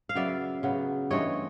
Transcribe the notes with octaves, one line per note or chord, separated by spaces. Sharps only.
F5
C#3 F#3 B3 D5 E5
C#3 F#3 B3
G2 E3 A3 C4 C#5 D#5